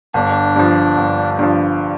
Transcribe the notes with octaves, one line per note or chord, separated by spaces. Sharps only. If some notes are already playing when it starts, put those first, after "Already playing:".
G1 D4
G2 F3
G1
G2 F3